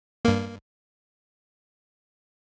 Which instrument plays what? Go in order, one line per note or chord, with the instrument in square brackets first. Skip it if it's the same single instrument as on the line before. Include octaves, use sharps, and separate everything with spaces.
[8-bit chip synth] G2 A#3